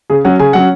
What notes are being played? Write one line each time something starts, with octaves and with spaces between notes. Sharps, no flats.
C#3 G#4
F#3 C#4 F#5
C#3 G#5
F#3 C#4 F#5